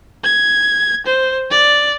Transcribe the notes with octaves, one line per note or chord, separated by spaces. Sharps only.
G#6
C5
D5